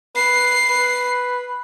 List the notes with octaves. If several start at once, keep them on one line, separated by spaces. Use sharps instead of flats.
B4 C7
B4